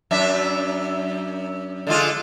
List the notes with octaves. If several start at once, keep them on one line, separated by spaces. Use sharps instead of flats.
F#2 D4 E5
D3 G#3 F4